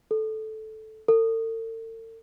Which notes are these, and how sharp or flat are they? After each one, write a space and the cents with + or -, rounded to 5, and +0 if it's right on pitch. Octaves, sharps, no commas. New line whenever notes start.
A4 -10
A4 +45